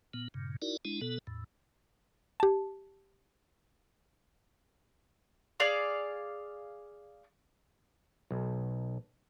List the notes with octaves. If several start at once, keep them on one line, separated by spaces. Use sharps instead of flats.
A#2 B3
G2 A#2 C#3
D#4 E4 F#4 A#4 D5
G#3 D4 E4
B2 B3 A4
E2 A2
G4 A5
G#4 D5 F5 D6
B1